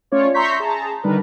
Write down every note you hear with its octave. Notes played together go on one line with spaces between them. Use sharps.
A3 C#4 F4 C#5 D5
E5 A#5 C6 C#6 G6 B6
G#4 A5 A#5
D3 D#3 G3 D4 A#4 B4